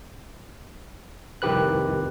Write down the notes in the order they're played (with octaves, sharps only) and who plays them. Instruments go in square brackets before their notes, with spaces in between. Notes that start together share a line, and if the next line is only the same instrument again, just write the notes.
[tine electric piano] C2 F2 D#3 G4 B4 F#6